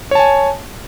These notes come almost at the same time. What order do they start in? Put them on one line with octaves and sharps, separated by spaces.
C#5 A5 G#5